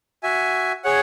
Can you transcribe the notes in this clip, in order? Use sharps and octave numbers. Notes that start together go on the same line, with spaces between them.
F#4 E5 G#5
G#4 C#5 F#5